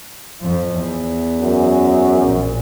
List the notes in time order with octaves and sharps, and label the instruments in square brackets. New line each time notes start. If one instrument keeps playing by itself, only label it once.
[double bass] F2 F3
E2
[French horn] F#2
[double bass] A#1 A#2